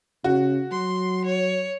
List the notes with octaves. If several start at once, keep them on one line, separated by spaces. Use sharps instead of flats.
C#3 F#4
F#3 C6
C#5